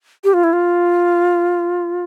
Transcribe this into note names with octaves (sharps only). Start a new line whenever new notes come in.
G4
F4
E4
F4